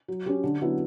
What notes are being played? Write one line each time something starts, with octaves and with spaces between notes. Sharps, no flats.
F#3
C#4 G4
D3
F#3 B3 E4